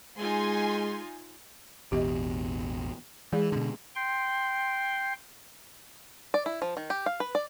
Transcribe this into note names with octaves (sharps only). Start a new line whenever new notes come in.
G#3 D#4 F4 G#5 C6
A1 E2 B2 G4 D#5
E3 G#3 G#4 D5
B2 D3
G5 C6
D5
E4
F3
D#3
G4
F5
B4
D5